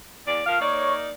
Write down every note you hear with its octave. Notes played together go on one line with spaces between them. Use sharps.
E2 D5
F3 A#4 F5
A#3 D#4 C#5 D5 C#6